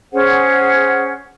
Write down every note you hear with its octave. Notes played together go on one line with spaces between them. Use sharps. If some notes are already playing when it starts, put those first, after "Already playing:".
C#4 G#4 C5 F#5